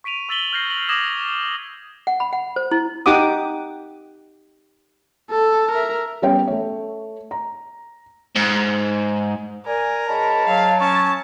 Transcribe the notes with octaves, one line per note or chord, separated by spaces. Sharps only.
C#6 B6 D7 D#7 F7
C#6 E6 A6 B6 F#7 G7
F6 G6 A#6 C7 F7
F#7
D6 D#6 G#6 A#6 E7 F#7
F#5
B5
F#5
C5
E4
D#4 G4 F#5 D6 D#6
A4
A#4 E5
G3 B3 C#4 G4 C#5 G5
A3 C#5
A#5
G#2
A#4 D5 G#5
G#2 C#5 A5 B5
F#3 F5
C#4 A5 C#6